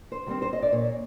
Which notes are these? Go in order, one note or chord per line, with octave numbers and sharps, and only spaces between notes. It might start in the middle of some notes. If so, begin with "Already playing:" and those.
C5
D#3 G3 C4
C5
D#5
D5
A#2 C#5